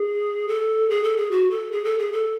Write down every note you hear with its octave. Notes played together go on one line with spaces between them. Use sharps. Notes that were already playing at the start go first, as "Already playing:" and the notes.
Already playing: G#4
A4
G#4
A4
G#4
F#4
A4
G#4
A4
G#4
A4